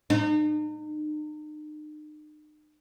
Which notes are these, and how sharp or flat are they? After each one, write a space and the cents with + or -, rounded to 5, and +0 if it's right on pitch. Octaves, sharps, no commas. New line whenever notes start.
D#4 -40